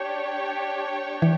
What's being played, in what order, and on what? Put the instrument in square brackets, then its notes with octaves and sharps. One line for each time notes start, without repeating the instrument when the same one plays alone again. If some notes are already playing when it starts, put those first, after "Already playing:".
Already playing: [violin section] D4 G4 C#5 G5
[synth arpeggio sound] E3